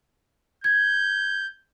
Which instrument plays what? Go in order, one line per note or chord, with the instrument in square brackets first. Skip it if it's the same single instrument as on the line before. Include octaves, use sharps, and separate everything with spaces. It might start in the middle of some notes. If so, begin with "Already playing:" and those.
[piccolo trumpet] G6 [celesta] G#6